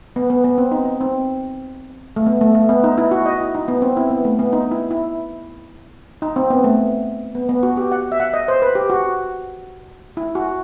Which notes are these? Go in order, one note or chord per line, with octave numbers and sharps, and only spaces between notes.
B3
B3
B3
C4
D#4
D#4
C4
A3
B3
A3
A3
B3
D#4
E4
F#4
D#5
E4
D#4
B3
C4
E4
B3
A3
B3
D#4
E4
E4
D#4
C4
B3
A3
B3
B3
F#4
G4
F#5
E5
F#5
D#5
C5
B4
G4
F#4
E4
F#4